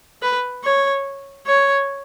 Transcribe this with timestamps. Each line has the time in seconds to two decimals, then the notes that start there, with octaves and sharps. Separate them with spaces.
0.22 B4
0.64 C#5
1.47 C#5